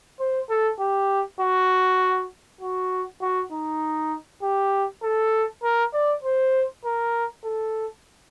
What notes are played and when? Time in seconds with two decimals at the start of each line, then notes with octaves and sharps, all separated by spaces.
0.20 C5
0.50 A4
0.80 G4
1.41 F#4
2.61 F#4
3.22 F#4
3.52 D#4
4.43 G4
5.03 A4
5.63 A#4
5.93 D5
6.23 C5
6.85 A#4
7.44 A4